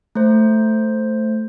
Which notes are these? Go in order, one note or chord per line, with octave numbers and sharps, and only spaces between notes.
A3 C5